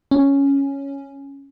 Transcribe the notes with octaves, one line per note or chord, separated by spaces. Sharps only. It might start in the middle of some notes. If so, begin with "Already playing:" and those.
C#4